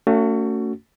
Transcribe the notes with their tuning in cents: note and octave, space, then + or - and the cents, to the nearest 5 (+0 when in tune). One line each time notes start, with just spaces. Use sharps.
A3 +35 C#4 +30 F#4 +0